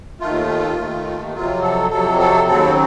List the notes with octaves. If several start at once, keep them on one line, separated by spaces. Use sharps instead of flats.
D#2 D#3 A3 F4
D#2 D#3 A3
F2 C3 F#3 F4
A4
F2 C3 F#3 A4
A4
D#2 C#3 F#3 C4 A4